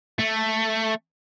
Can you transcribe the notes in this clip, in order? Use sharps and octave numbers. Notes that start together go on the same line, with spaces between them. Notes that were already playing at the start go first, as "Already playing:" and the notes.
A3